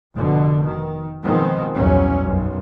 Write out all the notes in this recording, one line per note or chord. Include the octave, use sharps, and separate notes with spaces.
F1 B2 D3
D#3
B2 D#3 F3 G#3 B3 C4
B1 E2 G2 A#2 F#3 C#4
B1 F#2